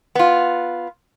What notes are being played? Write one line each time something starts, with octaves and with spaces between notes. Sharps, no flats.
B3 F4